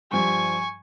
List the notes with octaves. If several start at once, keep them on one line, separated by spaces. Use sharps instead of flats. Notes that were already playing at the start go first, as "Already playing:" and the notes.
G2 F3 G3 G#5 C#6